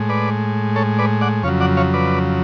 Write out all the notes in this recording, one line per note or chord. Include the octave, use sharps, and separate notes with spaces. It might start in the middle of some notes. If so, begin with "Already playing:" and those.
Already playing: A2 G#3
B4 D5
A4 C#5
B4 D5
D5 F#5
F2 C#3 F#3 C#5 F5
D5 F#5
C#5 F5
B4 D5